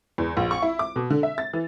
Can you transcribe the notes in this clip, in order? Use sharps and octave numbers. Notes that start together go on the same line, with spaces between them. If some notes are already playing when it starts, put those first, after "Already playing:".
E2
A#1
C#6
E4
D6
B2
D3
E5
A6
E3